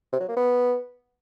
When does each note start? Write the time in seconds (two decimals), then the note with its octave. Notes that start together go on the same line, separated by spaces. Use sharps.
0.12 C3
0.20 F#3
0.28 A#3
0.36 B3